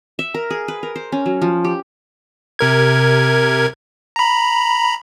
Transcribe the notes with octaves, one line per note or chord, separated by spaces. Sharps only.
E5
A#4
G#4
B4
A#4
C5
C#4
F#3
F3
G4
C3 A#4 G#6
A#5 B5